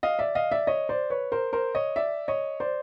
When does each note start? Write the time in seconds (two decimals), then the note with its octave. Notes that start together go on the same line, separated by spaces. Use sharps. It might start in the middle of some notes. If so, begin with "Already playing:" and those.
0.03 D#5 F5
0.19 D5 E5
0.35 D#5 F5
0.52 D5 E5
0.67 C#5 D#5
0.89 C5 D5
1.10 B4 C#5
1.32 A#4 C5
1.53 A#4 C5
1.75 C#5 D#5
1.96 D5 E5
2.28 C#5 D#5
2.60 C5 D5